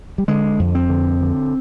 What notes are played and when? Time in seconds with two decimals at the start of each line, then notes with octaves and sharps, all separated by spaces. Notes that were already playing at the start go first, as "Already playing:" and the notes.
0.18 G3
0.28 D3 G#3
0.59 F2
0.75 C4
0.90 D3
1.21 D3